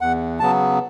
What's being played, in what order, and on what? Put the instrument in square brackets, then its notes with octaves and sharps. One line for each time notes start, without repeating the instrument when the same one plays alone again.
[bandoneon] E2 F#5
C#3 F#3 B3 A5